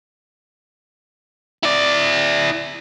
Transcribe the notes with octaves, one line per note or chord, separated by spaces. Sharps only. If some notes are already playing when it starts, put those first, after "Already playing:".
E4 D5